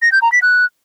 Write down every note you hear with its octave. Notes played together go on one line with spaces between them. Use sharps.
A#6
G6
A#5
B6
F#6